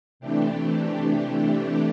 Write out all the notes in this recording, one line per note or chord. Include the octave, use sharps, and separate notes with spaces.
C3 E3 A3 D4 G4